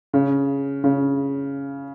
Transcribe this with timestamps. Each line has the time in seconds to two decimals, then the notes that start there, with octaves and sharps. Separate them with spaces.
0.13 C#3
0.84 C#3